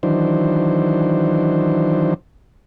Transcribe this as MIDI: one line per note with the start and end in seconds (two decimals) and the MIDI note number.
0.03 2.14 51
0.03 2.14 52
0.03 2.14 54
0.03 2.14 62
0.03 2.14 72